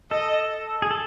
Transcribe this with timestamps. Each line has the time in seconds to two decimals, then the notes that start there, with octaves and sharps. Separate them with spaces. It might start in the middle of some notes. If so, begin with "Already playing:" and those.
0.11 A4 D#5
0.82 G#4
0.91 A4